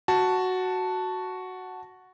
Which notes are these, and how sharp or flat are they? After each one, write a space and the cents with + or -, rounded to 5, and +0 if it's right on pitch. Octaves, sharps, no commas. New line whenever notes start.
F#4 +0 A5 +0